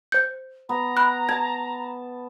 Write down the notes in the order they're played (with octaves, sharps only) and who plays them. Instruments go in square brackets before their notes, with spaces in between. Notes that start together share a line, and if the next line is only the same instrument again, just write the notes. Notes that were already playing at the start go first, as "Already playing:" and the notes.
[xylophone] C5 G6
[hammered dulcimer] B3 [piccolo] A#5
[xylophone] B5 F#6
[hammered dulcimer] A5 [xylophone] G#6